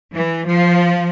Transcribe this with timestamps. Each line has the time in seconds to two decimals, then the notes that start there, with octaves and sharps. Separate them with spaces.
0.15 E3
0.47 F3